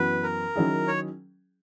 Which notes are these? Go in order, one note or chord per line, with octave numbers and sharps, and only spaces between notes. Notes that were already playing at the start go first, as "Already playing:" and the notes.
Already playing: F#2 E3 B3 F#4 B4
A#4
D#3 F#3 C#4 E4 G#4
C#5